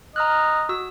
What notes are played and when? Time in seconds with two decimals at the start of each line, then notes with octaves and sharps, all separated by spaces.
0.16 D#5 A#5 F6 F#6
0.69 F#4 E6